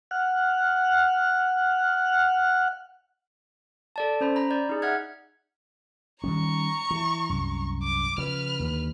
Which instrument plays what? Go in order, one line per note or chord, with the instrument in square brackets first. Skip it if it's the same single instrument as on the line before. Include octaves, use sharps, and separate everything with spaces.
[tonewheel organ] F#5 F6 F#6
[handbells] A4 D5 A5
C#4 C5 B5
A#5 B5
D5 G6
D#4 G#4
E5 F#5 F6 F#6 G#6
[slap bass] D#3 G3 C#4 [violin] A#5 C#6
[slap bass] E3
C2 F#2
[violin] D6
[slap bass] C#3 F3 [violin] B4 F6
[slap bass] D#2 D3